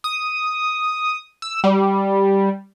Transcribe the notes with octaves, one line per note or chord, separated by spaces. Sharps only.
D#6
E6
G3